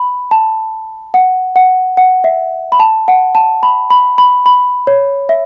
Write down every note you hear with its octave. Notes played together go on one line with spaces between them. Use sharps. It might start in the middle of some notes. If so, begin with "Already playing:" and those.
Already playing: B5
A5
F#5
F#5
F#5
E5
B5
A5
F#5
A5
B5
B5
B5
B5
C#5
E5